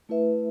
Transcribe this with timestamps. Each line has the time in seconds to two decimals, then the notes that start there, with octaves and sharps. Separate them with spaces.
0.09 A3 E4 B4 E5